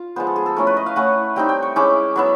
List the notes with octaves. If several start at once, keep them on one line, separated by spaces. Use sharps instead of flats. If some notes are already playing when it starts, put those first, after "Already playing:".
Already playing: F4
F3 G#3 B3 C5
A4
G#4
A4
A3 C#4 E4 A#4
B4
D#5
F5
A3 C#4 E4 F#5
G3 C4 D#4 G5
G5
C#6
G#3 C#4 E4 D6
F#3 B3 E4